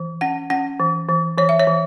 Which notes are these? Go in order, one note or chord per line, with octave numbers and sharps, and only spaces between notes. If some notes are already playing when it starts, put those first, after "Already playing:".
Already playing: E3
C#4 F#5
C#4 F#5
E3
E3
E3 C#5
E5
C#5
E3